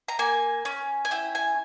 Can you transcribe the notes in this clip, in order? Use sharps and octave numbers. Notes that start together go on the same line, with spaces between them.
A#5
A#3 G#5
C#4
G#5
E4 G5
G#5